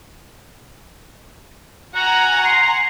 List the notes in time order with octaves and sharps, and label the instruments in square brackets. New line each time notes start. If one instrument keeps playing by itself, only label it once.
[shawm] F#4 [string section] F#5 G#5 A#5
[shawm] C6